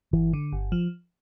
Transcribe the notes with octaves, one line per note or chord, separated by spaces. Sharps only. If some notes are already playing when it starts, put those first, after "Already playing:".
G1 E3
D3
G1
F3